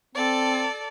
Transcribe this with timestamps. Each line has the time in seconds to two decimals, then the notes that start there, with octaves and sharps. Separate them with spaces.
0.15 C4 A4 D5